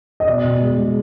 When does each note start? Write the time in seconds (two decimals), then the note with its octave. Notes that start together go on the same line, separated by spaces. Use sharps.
0.20 D#5
0.27 B2 D5
0.44 B2
0.62 G#3
0.78 G#3